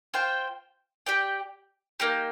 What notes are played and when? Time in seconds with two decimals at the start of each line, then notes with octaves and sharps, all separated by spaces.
0.14 F4 C5 G5
1.06 G4 D5 G5
2.00 A#3 D#4 G4